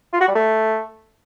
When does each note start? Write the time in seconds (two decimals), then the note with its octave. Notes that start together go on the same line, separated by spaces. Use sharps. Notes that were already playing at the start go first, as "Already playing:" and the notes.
0.13 F4
0.20 F#4
0.28 G3
0.35 A3